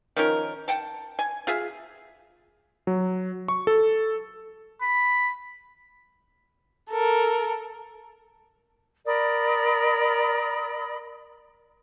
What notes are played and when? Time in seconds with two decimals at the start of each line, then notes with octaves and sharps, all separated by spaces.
0.16 D#3 F3 C#4 A#4
0.68 F#5 G5 A5
1.19 G#5
1.47 F4 G#4 E5
2.87 F#3
3.48 C#6
3.67 A4
4.81 B5
6.90 A4 A#4
9.06 A#4 D5 B5 D#6